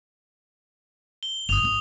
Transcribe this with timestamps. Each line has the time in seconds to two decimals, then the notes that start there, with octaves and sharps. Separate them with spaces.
1.23 G7
1.49 G1 D#6 F7
1.63 G#1